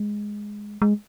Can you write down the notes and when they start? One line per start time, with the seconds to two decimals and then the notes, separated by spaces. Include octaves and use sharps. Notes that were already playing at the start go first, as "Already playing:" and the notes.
Already playing: G#3
0.82 G#3